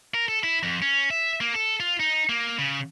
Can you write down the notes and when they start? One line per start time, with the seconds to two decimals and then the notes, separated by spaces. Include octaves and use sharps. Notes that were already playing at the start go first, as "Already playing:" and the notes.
0.14 A#4
0.28 A4
0.44 E4
0.63 F2
0.82 C#4
1.11 E5
1.41 A#3
1.54 A4
1.80 F4
2.00 D#4
2.29 A#3
2.59 C#3